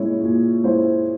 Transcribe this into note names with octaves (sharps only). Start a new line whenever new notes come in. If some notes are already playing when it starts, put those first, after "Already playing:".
Already playing: A#2 G#3 C#4 E4 C#5
A#2
G#3 C#4 E4 C5